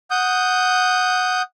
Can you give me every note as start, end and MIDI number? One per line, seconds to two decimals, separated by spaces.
0.11 1.42 78
0.11 1.42 87
0.11 1.42 91